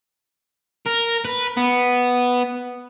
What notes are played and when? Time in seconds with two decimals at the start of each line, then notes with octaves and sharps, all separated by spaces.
0.86 A#4
1.25 B4
1.57 B3